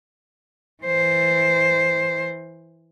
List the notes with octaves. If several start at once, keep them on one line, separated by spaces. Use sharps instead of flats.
E3 C5